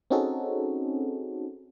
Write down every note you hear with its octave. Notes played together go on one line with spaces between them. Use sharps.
C4 C#4 D#4 F#4 G#4 A4